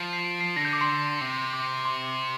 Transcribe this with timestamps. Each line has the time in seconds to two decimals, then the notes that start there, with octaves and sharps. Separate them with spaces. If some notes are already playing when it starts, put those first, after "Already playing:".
Already playing: F3
0.13 C7
0.25 D7
0.41 C7
0.56 D3 A#6
0.65 G6
0.73 D6
0.81 C6
1.21 C3
1.53 D6
1.85 C6